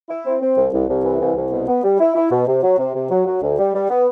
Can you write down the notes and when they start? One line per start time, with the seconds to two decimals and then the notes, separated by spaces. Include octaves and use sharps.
0.10 E4
0.25 C4
0.42 C4
0.57 C2
0.73 C2
0.89 C2
1.05 E3
1.20 C2
1.36 C2
1.52 B2
1.68 B3
1.84 G3
2.00 E4
2.16 E4
2.31 B2
2.48 C3
2.63 F#3
2.79 C3
2.95 C3
3.11 F#3
3.27 F#3
3.42 D2
3.58 G3
3.74 G3
3.90 B3